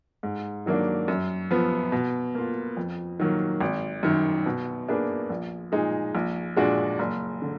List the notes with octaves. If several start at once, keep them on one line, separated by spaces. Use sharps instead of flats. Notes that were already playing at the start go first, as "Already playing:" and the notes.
G#2
D#3 F#3 A#3 D4
F#2
F3 B3
B2
A#3 F4
F2
D#3 F#3 A#3
G#1
F#2 D#3
B2
A#3 D4 G#4 B4
A#1
A#2 G#3 D#4 G#4
A#1
A#2 G#3 D4 F#4
F#1
D3